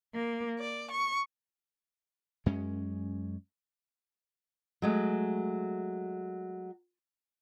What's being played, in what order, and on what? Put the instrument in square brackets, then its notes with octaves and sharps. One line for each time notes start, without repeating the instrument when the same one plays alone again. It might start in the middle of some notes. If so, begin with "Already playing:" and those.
[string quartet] A#3
D5
C#6
[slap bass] F#2 G#3 C#4
[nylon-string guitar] F#3 G#3 A3